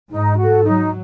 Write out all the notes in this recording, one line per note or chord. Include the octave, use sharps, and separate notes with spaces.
G#2 D#4
F#4 A4
F#3 D#4